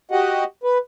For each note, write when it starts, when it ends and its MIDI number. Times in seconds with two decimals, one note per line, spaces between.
0.11 0.44 66
0.11 0.44 67
0.11 0.44 75
0.11 0.44 78
0.64 0.78 71